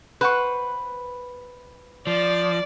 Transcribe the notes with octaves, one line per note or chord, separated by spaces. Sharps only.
B4 C5 F#5 C#6
F3 D5